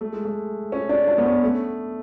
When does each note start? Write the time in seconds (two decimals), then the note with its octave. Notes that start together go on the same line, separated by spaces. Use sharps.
0.01 A3
0.12 G#3
0.25 A3
0.72 C#4
0.89 D4
1.07 D4
1.18 B3
1.25 C#4
1.43 A3